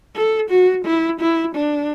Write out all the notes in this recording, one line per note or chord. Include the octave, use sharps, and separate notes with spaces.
A4
F#4
E4
E4
D4